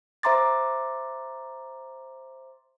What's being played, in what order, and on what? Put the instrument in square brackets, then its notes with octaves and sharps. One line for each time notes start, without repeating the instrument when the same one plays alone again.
[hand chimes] C5 E5 A#5 C6 D6 A6